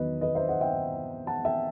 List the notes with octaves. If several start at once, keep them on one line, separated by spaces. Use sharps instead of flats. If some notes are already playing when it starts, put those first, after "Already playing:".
Already playing: E2 D#3 F#3 B4 D#5
B4 D#5
C5 E5
D#5 F#5
E5 G5
F#5 A5
E5 G5